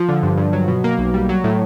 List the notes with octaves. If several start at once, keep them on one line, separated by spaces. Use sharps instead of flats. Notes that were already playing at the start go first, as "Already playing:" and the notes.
Already playing: F3
D3
G2
G2
F#3
B2
A#3
B1
G3
F#3
A2